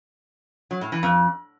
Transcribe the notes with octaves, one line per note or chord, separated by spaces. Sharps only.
F#3
A2
E3
F2